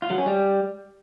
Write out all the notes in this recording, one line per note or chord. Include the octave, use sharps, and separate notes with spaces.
F4
F#3
C#4
G3